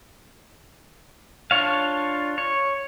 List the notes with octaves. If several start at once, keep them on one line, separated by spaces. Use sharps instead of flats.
D4 F4 C#5 F5
C#5